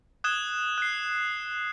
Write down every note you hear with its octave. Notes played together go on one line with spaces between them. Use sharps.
D#6 F#6 G#6 E7 G7
F#6 C7